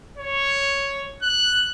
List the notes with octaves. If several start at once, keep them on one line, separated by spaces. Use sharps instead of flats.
C#5
F#6